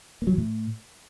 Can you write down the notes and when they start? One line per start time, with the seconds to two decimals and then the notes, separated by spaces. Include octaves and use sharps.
0.22 A#3
0.27 F#3
0.32 E3
0.38 A2